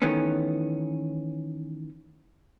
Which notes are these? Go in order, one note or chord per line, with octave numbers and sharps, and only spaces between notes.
D#3 E3 A3 B3 C#4